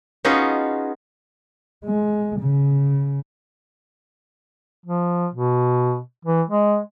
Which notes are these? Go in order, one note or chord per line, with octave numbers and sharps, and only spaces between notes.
B3 C#4 D#4 F4 F#4 G#4
G#3
C#3
F3
B2
E3
G#3